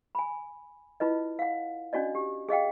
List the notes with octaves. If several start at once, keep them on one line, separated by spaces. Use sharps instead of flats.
G#5 B5
E4 F4 B4 D#5
F5 F#5
C#4 D4 F#4 D5 D#5
G4
G#4 D#5 F5 G5